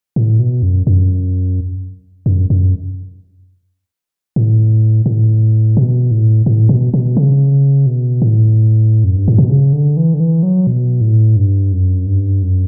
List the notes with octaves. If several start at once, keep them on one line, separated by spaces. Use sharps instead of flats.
A2
B2
F#2
F#2
F#2
F#2
A2
A2
B2
A2
A2
B2
B2
C#3
B2
A2
F#2
G2
A2
B2
C#3
D3
E3
D3
E3
F#3
B2
A2
G2
F#2
G2
F#2